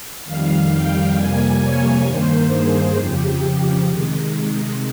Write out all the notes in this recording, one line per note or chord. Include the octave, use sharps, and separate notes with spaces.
F2 D#3 G3 F5
G5
F2 C3 G3 A#3 G#5
C#5
G2 D#3 A#3 C5
G#4
F2 C#3 F3 G4
C3 D#3 G#3